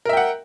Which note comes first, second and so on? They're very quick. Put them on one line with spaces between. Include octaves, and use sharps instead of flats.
A#4 E5 G5 F#5